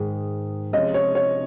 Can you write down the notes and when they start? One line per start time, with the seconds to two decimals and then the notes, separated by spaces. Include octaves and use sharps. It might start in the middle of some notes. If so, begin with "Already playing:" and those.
Already playing: G#2 D#3 G#3
0.73 C3 F3 G#3 C#4 F4 D#5
0.94 C#5
1.15 C#5